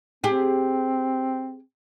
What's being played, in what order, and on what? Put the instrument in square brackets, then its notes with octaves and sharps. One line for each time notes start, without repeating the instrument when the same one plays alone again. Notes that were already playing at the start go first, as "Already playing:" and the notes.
[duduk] C4 [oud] G4 G#4